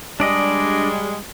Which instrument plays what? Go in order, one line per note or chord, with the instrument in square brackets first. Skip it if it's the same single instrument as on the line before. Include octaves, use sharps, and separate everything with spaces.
[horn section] G3 G#3 [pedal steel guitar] D4 D5 D#5